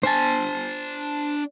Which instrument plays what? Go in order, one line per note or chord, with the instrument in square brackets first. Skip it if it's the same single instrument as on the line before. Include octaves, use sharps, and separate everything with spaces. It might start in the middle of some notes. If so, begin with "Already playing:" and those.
[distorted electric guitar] D4 G#5 [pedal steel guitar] C5 A5